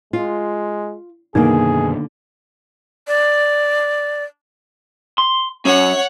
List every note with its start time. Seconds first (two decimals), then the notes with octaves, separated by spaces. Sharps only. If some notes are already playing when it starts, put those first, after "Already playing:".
0.13 G#3 F4
1.35 F#2 B2 D3 D#3 A#3 D#4 G#4
3.07 D5
5.18 C6
5.65 F#3 C#4 C#5 F#5